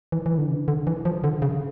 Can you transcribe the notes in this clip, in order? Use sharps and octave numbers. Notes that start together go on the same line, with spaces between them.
E3
E3
D3
C#3
D3
E3
F3
D3
C#3